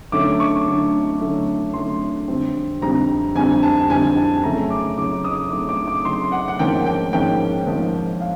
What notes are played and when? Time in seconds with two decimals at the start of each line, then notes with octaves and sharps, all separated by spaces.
0.12 D3 F#3 A3 C#4 D6
0.40 C#6
0.66 D3 F#3 A3 C#4
1.20 D3 F#3 A3 C#4
1.74 D3 F#3 A3 C#4 C6
2.28 F2 D3 G3 C4
2.82 F2 D3 G3 C4 A#5
3.35 F2 D3 G3 C4 G#5
3.63 A5
3.90 F2 D3 G3 C4 G#5
4.17 A5
4.43 C#3 F#3 A3 C#4 A#5
4.70 D6
4.98 C#3 F#3 A3 C#4 D6
5.24 D#6
5.51 C#3 F#3 A3 C#4 D6
5.69 D6
5.88 D6
6.05 C#3 F#3 A3 C#4 C6
6.32 F#5
6.48 F#5
6.59 G#2 F3 A#3 C#4 G5
6.86 G5
7.13 G#2 F3 A#3 C#4 G5
7.67 G#2 F3 A#3 C#4
8.21 F5